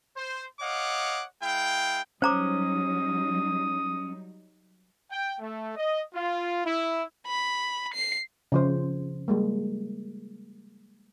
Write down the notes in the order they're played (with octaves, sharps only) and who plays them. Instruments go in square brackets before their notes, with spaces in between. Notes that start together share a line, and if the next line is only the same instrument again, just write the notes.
[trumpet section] C5
C#5 D#5 F5 F#5 D6
G#3 E4 F5 G5
[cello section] F#3 G3 D#4 [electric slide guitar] C#4 [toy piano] C5 A#5 D6 [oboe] D#6
[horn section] G5
A3
D#5
F4
E4
[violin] B5
C7
[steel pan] C#3 F3 C5
G3 G#3 A#3